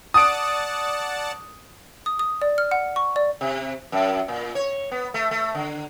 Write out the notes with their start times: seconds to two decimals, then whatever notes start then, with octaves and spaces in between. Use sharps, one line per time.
0.14 D5 F#5 A5 D#6 D7
2.06 D#6
2.19 D#6
2.42 D5
2.58 F6
2.71 F#5
2.96 C#6
3.16 D5
3.41 C3
3.92 F#2
4.28 A#2
4.55 C#5
4.91 B3
5.14 A3
5.31 A3
5.54 D3